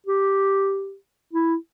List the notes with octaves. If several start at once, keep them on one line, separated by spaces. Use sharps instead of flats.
G4
E4